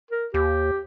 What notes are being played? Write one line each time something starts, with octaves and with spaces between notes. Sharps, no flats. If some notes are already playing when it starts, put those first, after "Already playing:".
A#4
D#2 G4